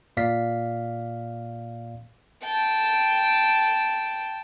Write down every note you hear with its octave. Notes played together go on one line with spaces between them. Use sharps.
A#2 D5 F5 B6
G5 A5